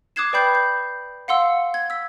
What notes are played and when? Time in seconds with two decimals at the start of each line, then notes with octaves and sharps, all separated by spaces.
0.16 D6 D#6 F#6 G#6 C7 E7
0.33 B4 D5 G5 B5 G6 C7
0.55 G6
1.28 F5 F#5 C6 E6
1.74 G#6
1.90 E6 B6